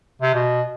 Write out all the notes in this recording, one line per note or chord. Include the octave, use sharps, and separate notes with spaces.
C3
B2